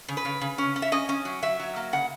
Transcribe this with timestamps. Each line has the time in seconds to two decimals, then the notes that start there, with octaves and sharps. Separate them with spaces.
0.08 C#3
0.17 B4
0.25 C#3
0.41 C#3
0.58 C#4
0.76 C#4
0.82 E5
0.92 C#4 D#5
1.09 C#4
1.25 F#3
1.43 F#3 E5
1.59 F#3
1.76 A#3
1.93 C#3 F#5